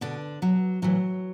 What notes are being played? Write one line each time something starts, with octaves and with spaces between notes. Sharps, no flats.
B2 D3 D4
B2 F#3
A2 E3 F#3